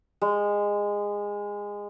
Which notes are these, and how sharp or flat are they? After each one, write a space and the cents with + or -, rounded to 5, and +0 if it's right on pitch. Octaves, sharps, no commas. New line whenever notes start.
G#3 -20